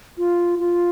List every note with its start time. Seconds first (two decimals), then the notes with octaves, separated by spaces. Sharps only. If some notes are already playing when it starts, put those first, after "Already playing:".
0.18 F4
0.59 F4